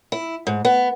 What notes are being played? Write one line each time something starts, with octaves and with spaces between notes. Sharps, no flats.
E4
G#2
B3